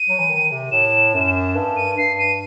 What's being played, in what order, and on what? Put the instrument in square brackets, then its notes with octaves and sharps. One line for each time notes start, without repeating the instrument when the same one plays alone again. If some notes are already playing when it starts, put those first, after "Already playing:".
Already playing: [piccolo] D#7
[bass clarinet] F#3
E3
D#3
C3
[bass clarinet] A2 [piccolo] E7
[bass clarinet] F#2
G2
[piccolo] D#7
[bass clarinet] G2 [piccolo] C7
[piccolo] D#7